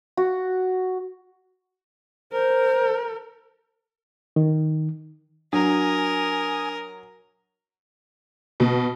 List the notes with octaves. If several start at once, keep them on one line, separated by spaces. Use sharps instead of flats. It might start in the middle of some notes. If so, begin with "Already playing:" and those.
F#4
A#4 C5
D#3
F#3 D4 A#4 G#5 D#6
B2